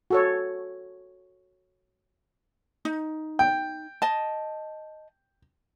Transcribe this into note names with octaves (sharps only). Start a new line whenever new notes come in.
F#4 A4 C#5
D#4
G5
D#5 A5